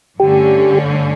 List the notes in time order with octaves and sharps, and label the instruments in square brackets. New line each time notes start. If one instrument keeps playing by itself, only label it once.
[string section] G2 D3 A3 C#4 [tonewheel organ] G4